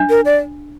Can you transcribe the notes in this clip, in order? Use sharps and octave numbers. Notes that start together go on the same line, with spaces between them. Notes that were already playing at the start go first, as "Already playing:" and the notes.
Already playing: D4
A#4
D5